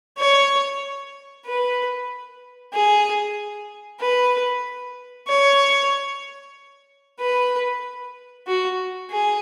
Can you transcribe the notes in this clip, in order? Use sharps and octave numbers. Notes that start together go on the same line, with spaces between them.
C#5
B4
G#4
B4
C#5
B4
F#4
G#4